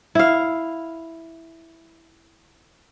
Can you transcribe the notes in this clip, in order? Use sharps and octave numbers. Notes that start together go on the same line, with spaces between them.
E4 F5